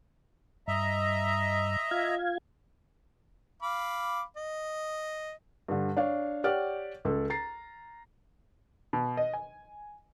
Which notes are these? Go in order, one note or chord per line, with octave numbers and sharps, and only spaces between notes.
G2 D#5 E5 A#5
F4 F5 G#6
F5 B5 D6
D#5
G2 D3
D4 C#5 F5
G4 C#5 D5 F#5 F6
C#2 A4
A#5 A6 C7
B2
D#5
G#5